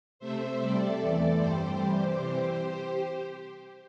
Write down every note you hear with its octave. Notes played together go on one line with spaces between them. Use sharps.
C3 A3 C4 C5 E5
C3 G3 C4 A4 D5
E2 E3 A3 C4
G2 G3 C4 G4 C5
C3 E3 G3
C3 E3 C4